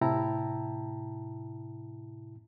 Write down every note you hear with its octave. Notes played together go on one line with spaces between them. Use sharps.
A2 C3 E4 G5 A5 A#5